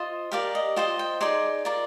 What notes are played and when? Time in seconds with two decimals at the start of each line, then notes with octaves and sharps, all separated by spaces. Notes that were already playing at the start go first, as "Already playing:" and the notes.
Already playing: F4 C5 D#5
0.31 G4 A#4 D5 F5
0.55 D#5
0.76 F4 C5 D#5 G5
0.99 G5
1.21 D#4 G#4 D5 C6
1.65 F4 A#4 D5